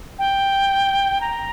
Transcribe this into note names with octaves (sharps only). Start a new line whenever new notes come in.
G5
A#5